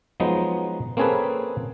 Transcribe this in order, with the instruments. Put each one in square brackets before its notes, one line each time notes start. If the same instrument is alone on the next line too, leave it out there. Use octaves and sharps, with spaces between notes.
[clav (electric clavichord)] F3 F#3 G#3 B3 D#4
A#3 C4 C#4 G#4 A4 B4